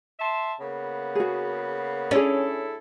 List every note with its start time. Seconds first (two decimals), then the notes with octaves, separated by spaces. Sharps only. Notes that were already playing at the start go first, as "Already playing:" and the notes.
0.19 E5 A5 C6
0.60 C#3 A#3 B3
1.15 F#4 G#4
2.11 C#4 E4 G#4 A4 D5